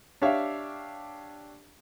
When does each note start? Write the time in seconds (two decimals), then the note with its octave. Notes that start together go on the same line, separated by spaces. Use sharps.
0.22 D4 G4 C#5 E5 F5